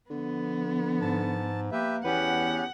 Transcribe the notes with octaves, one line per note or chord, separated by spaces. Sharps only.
D3 F3 B3
G#2 A5
A#3 G4 B4 E5
E2 B3 C#4 G4 B4 F#5